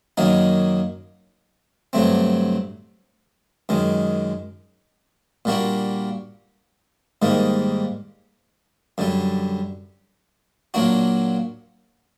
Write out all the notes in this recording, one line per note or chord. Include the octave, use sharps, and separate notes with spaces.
F#2 D#3 F#3 A#3 D#4
G2 D3 F#3 A3 C4
F#2 D#3 G#3
A#2 G3 A#3 D4 F#4
G#2 D#3 G3 A#3
F#2 D3 G3
A#2 F#3 A#3 D4 F#4